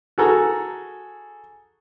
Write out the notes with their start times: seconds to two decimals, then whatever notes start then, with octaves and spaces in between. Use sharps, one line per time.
0.18 F#4 G#4 A4 A#5